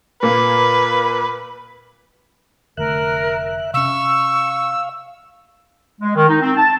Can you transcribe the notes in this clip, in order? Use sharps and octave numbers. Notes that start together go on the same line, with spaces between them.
A#2 A#3 B4
F1 D3 A3 A#4 E5 F#6
C3 C#4 F5 C#6 E6
G#3
D#3
D#4
C4
A5